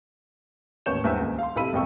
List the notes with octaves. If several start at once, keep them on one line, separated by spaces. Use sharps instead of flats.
A1 D#2 B3 C#5 G6 E7
E1 E2 G2 C5 E5 G#5
D#1 C#2
F5 C6
B1 C3 E4 A4 B5 D#7
E1 B1 F2 G5 C#6 E6